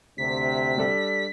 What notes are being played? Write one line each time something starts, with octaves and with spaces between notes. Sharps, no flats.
D2 C3 B6
G3 D4 A4